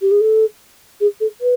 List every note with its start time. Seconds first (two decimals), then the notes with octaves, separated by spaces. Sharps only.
0.01 G4
0.11 G#4
0.20 A4
1.00 G#4
1.20 A4
1.41 B4